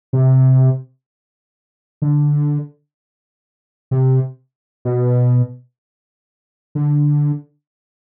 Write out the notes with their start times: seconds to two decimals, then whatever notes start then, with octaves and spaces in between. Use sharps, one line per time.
0.13 C3
2.02 D3
3.91 C3
4.85 B2
6.75 D3